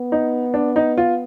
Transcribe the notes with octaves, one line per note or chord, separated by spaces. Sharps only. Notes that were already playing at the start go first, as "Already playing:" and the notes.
Already playing: B3
D#4
D4
D#4
F4